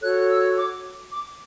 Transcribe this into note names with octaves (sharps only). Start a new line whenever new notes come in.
F#4 A4 C#5 F#6
E6
D6
D6